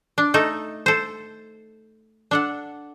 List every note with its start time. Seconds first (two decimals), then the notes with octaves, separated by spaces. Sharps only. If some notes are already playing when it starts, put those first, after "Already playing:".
0.18 D4
0.34 A3 D#4 A4
0.86 A4 C5
2.31 D4 A4 F#5